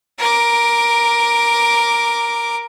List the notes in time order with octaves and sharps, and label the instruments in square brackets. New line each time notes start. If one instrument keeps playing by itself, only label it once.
[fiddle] A#4 D6